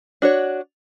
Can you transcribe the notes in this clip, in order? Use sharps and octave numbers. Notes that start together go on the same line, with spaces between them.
D4 F#4 C#5